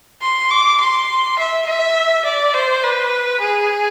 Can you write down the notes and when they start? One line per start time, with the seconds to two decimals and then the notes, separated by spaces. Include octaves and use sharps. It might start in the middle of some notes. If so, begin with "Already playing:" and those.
0.21 C6
0.50 D6
0.80 C6
1.38 E5
1.66 E5
2.25 D5
2.54 C5
2.83 B4
3.40 G#4